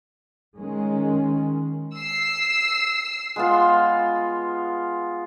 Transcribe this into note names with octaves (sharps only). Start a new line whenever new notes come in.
D#3 G#3 C#4
E6 C7
G#3 B3 F4